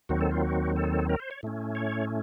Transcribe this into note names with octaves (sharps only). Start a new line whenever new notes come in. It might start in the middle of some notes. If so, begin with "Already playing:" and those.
D#2 D#3 F#3 C4 F#4
A4
F4
F#4
A4
A#4
C5
C#5
A2 A3 C#4
C#5